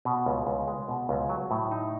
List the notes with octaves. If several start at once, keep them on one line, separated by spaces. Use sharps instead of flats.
B2
C#2
C#2
G#3
B2
C#2
F#3
A2
D#4